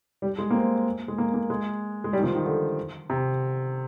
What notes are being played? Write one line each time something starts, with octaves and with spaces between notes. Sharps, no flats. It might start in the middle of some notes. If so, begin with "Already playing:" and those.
G3
G#3
A#3
C4
G#3
A#3
A#3
G#3
G#3
G3
D#3
F3
D#3
D3
C3